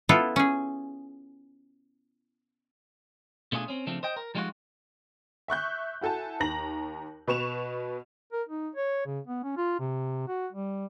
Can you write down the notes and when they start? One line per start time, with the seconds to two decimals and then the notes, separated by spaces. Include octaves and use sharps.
0.09 B3 E4 F4 A4
0.36 C#4 G#4
3.52 B2 A3 D4 F4 G#4
3.68 C4 C#4
3.87 C#3 F3 A3 C4 D4
4.03 C5 D#5 G5
4.16 A#4
4.35 F3 G3 G#3 D#4 F4 F#4
5.48 E5 C#6 F#6 G6
6.01 E4 F#4 A4 G#5 A5
6.40 D#2 A#5 A#6 F#7
7.27 B2 B4 C#6 E7 F7
8.33 A#4
8.49 D#4
8.76 C#5
9.06 C#3
9.27 B3
9.44 C#4
9.57 F4
9.80 C3
10.28 F#4
10.53 G3